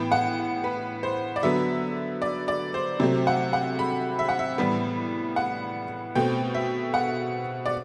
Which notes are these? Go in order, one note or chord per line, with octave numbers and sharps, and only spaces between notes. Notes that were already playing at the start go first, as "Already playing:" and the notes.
Already playing: A2 E3 B3 G5
F#5
B4
C5
D5
D3 F#3 B3 E5
D5
D5
C5
C3 F#3 A3 C4
F#5
F#5
B5
E5
F#5
E5
A2 E3 G3 B3
F#5
B2 A3 C4 G5
E5
F#5
D5